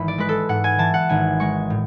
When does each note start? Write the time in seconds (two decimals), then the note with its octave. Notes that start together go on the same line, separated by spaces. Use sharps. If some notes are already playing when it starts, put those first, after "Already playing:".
Already playing: G#1 G#2 E3 B5
0.08 D5
0.18 G#3 B4
0.29 A4
0.49 G#2 F#5
0.64 G#5
0.79 E3 A5
0.94 F#5
1.09 G#1 G#5
1.40 G#3 C#6
1.70 A2